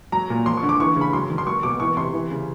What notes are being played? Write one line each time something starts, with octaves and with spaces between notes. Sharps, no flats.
F#3 A#5
A#2
F3 C6
C#6
D3
D6
E3 C#6
C#3
B5
F#3 C6
D#3
C6
F#3 C#6
B2 D6
E3 C#6
C3 C6
E3
C#3